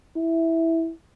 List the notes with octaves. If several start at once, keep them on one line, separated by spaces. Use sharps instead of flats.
E4